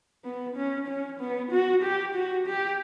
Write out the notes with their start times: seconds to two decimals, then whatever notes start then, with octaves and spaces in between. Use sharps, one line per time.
0.25 B3
0.56 C#4
0.88 C#4
1.20 B3
1.52 F#4
1.83 G4
2.15 F#4
2.47 G4